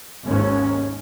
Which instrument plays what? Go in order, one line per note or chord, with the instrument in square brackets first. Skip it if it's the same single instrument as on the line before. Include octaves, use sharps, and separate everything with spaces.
[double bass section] G#1 D#2 G#2 D#3 C#4